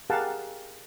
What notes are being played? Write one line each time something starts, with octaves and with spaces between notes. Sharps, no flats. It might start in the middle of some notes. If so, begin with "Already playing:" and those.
G4 G#4 A#4 F5 F#5 A5